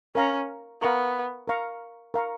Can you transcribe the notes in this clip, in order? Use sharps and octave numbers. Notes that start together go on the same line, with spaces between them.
C#4 A#4 F5 A#5 C#6
B3 A#4 F5 A#5 C#6
A#4 F5 A#5 C#6
A#4 F5 A#5 C#6